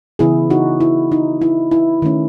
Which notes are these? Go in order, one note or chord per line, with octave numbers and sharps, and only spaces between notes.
C#3 E3 B3 E4 G#4
D#4 F#4
E4
D#4
E4
E4
D#3 A3 C#4